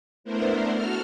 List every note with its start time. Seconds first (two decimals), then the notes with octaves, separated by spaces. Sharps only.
0.24 A3 B3 D4 E4 A#4 C5
0.70 F#4 A4 F6